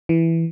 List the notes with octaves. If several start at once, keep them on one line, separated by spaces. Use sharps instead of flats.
E3